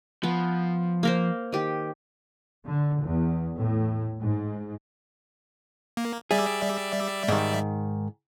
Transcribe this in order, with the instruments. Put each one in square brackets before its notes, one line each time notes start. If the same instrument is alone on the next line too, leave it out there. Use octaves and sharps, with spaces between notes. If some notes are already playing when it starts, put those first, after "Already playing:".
[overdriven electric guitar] F3 [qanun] B3
[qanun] A#3 A#4 C5
D#3 G4
[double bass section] D3
E2
A2
G#2
[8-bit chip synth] A#3
[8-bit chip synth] G3 D5 E5 [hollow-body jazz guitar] G#4
[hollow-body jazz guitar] G#2 D#3